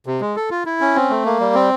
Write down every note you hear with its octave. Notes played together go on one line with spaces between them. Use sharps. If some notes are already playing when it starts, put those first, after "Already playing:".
C3
G#3
A4
F4
E4
C#4
C4
A3
A#3
G3
C4